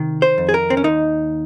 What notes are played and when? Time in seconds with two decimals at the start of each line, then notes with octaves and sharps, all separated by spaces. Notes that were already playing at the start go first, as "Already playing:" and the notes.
Already playing: C3 D#3
0.22 C5
0.38 F2
0.49 G#4
0.54 A#4
0.70 C4
0.77 C#4
0.84 D#2 D#4